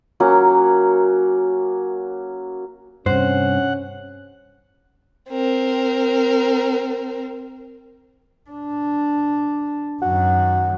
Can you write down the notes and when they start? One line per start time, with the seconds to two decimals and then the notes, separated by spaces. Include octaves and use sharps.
0.20 F#3 A#3 C#4 F#4
3.06 G2 C3 C#4 C5 F#5
5.30 C4 A#4
8.50 D4
10.02 F#2 D#3 F#4